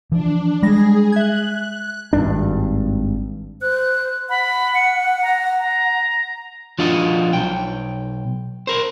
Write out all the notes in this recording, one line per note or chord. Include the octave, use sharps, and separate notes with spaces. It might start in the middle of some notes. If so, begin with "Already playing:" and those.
E3 F3 D4
G3 G#3 G#4 A#6
E5 F#6 G#6
G#1 G2 D4
C5 F#6
F#5 B5
C#7
A#5
A#5
F3 D4 F4 F#4 D#5
B1 G5
A#4 C5